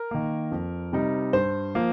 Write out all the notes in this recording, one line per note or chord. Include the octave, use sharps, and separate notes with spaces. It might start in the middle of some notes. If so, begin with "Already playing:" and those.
Already playing: A#4
D#3 A#3
F2
C3 G3 D#4
G2 C5
F3 A#3